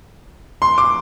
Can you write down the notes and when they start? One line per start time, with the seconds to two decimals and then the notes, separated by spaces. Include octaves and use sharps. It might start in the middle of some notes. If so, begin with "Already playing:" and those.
0.62 C6
0.78 D6